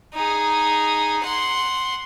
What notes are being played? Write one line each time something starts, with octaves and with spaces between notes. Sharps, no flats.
D#4 G#4
F#5 C6